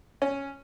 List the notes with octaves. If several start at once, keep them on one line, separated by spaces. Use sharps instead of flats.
C#4